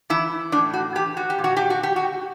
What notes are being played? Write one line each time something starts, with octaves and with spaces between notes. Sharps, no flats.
E3 E4
A2 D4
F#4
E3 G4
F#4
G4
A#2
F#4
G4
F#4
G4
F#4